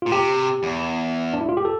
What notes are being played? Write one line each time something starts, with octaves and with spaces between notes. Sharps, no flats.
A#2 F4
C3 G4
E2
D4
E4
F4
G4
A4